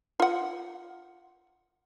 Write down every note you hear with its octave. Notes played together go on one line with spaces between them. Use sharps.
F4 F#5